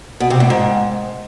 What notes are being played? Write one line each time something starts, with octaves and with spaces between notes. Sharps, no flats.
B2
C3
A2
G#2